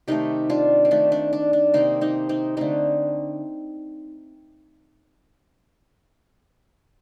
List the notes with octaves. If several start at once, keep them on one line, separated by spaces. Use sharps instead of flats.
C3 D#3 A3 D#4 G4
D4 F4
C4
D#3 A3 D4
D4
D4
D4
C3 D#3 A#3 C4 D#4
C4 D#4
C4 D#4
D3 A3 C4 D#4